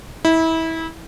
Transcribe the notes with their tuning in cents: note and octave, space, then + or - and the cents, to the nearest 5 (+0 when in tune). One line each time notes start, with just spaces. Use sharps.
E4 -25